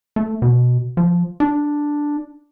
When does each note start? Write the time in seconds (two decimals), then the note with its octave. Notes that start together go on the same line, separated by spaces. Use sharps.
0.16 A3
0.42 B2
0.97 F3
1.40 D4